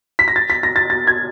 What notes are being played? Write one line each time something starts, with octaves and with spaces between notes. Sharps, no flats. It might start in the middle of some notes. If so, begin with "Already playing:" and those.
B6
A#6
A6
B6
A#6
A6
A6
G#6